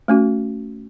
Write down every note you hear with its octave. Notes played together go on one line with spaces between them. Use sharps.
A3 C#4 F#4